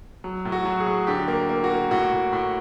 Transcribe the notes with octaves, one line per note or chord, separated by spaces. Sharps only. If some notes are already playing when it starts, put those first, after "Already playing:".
F#3
A2
F#4
F#3
G#4
A2
D3 G4
A#3
A#3
F#4
A#3
A2 F#4
A2
A2